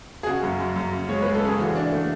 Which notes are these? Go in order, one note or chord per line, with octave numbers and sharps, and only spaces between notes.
G#4
C#3 F#4
F#2
F#2
F#2
C#3
G#3 C#5
G#3 B4
A4
C#3 G#4
E3 F#4
D4
A3